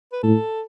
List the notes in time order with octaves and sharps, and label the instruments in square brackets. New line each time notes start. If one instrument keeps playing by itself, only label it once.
[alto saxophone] B4
[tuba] A2 [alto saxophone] A4